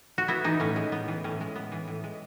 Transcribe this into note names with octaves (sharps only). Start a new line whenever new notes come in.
F#4
B3 E4
E3 D#4
A2 C#4
G#3
B3
E3
A2 C#4
G#3
B3
E3
A2
G#3